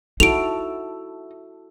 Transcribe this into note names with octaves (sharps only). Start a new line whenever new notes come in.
D#4 E4 F#4 A4 D7 F7